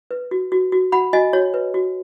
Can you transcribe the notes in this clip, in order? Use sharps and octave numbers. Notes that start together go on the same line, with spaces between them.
B4
F#4
F#4
F#4
F#4 F#5 B5
F#4 D#5 G#5
F#4 C#5
B4
F#4